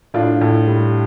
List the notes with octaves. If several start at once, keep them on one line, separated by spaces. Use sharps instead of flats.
A2 D4 F4
A2
G3